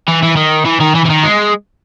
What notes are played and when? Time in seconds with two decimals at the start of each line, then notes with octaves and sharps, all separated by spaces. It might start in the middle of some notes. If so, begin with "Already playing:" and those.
0.08 E3
0.23 E3
0.37 D#3
0.65 E3
0.80 D#3
0.95 E3
1.05 E3
1.09 D#3
1.23 G#3